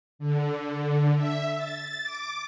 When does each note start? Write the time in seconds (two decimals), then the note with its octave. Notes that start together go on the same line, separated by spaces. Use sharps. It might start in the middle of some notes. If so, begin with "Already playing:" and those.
0.19 D3
1.16 E5
1.57 A6
2.03 D6